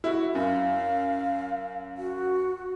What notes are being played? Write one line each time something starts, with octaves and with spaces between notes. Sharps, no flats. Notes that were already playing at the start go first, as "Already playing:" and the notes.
E4 F#4
F#2 F5
F#4